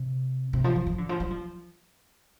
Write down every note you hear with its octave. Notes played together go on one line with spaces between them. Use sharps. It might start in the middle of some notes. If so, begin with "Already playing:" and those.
Already playing: C3
C3
F3
F3
F3
D3
F3
G3
F3